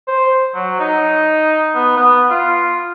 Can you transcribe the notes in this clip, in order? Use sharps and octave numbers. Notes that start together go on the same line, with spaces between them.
C5
F#3
D#4
B3
B3
F4